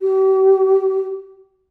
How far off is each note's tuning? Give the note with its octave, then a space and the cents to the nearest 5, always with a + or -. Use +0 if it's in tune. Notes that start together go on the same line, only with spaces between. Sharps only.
G4 -40